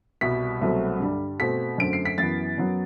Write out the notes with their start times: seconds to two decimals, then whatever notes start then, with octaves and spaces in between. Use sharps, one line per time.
0.21 C2 B2 G3 B6
0.61 C2 B2 F#3 A3 C4
1.00 G2 D3 G3
1.39 B2 A3 C4 B6
1.78 F#2 D3 A3 C4 D7
1.93 C7
2.05 B6
2.18 F#2 E3 B3 A6
2.58 F#2 F#3 B3